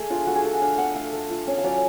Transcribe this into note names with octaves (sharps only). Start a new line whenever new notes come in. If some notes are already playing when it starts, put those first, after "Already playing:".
Already playing: A3 G#4
D4 F4
A3 F#4
G#4
A3 A4
F#5
D4 F5
D4 F#5
A3 F5
A3
F4
C#4
F5
F#3 D5